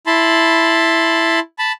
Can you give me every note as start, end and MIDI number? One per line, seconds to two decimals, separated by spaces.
0.07 1.40 64
0.07 1.40 81
0.07 1.40 83
0.07 1.40 84
1.59 1.72 81
1.59 1.72 83